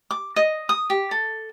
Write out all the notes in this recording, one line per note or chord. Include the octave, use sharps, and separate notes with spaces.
D6
D#5
D#6
G4
A4